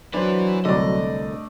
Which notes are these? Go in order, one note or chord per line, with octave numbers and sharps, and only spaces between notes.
F#3 D4 E4 B4 C5
C2 D3 A3 D4 D5 D#5